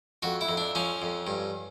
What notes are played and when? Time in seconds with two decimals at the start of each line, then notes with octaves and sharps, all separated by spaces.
0.22 F2 F#4
0.41 E4
0.48 F2
0.57 D4
0.75 F3 C#4
1.02 F2
1.27 G2